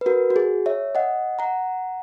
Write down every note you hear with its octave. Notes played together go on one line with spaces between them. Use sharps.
B4
F#4 A#4
F#4
G#4
C#5 E5
D#5 F#5
F#5 A#5